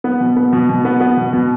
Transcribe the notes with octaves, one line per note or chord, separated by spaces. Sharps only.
B3
B2
B3
B2
B2
B3
B3
B2
B2